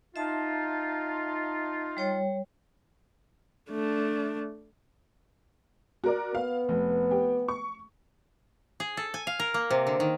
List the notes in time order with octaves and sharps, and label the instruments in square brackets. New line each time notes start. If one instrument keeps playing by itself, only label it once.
[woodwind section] D#4 F4 [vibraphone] E5 A5
[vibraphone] G3 C#5 G5
[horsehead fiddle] A3 D4
[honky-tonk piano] F#4 A#4 D5
[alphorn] B3 [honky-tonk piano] F5
[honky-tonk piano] F1
G4
C#6
[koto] G#4
A4
G#5
F5
A#4
A#3
C3
D3
D#3